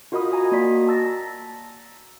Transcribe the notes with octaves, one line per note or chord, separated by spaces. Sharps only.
F4 F#4 A#4 D#5 B5 D#6
D#5 G#5 A#5
A#3 F#4 D5 B6
A5 E6 A6 A#6
A#5